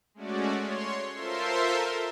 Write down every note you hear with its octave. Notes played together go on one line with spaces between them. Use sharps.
G#3 A3 C#4 F#4 D5
C#5 C6
F4 A4 A#4 C5 E5 C6